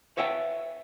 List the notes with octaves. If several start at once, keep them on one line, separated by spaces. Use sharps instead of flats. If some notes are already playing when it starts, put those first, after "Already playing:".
B4 C#5 E5 F#5 G5